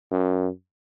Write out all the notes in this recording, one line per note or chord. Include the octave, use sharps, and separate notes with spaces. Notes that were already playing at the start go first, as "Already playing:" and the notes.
F#2